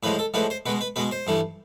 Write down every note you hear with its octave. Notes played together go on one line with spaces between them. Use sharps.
A2 F3 G#3 B4
A4
A2 F3 G#3 B4
C5
B2 G#3 B4
B4
B2 G#3 B4
C5
G2 E3 A3